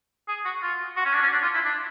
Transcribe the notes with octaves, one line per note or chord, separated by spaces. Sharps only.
G#4
F#4
F4
F#4
C#4
D4
C#4
D4
F4
E4
D4